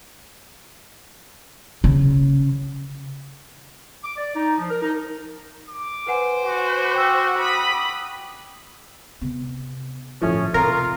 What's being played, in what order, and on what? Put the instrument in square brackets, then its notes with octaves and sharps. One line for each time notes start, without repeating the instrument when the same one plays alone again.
[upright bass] C#3
[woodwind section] D6
D5
D#4
F3
A#4
D#4
[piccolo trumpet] D6
[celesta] B4 F#5 G#5 [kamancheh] C5
[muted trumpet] F#4
[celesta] G5 E6 [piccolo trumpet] D6
[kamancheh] B5 D#6
[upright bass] C3 B3
[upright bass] G1 A2 [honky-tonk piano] F3 A3 [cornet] C#4
[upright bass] B1 C3 [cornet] F4 [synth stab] A#4